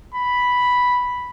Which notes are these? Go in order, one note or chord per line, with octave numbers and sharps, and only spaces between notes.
B5